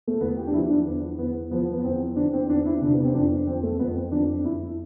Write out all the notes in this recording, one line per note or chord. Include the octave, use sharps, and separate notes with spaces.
A3
E2 B3
G4
D4
F3 E4
D4
E2 B3
E2 B3
F3 B3
B3
E2 C4
E2 D4
C4
E2 D4
E4
C3 D4
B3
C4
F2 D4
F2 C4
A3
F2 B3
C4
F2 D4
F2 E4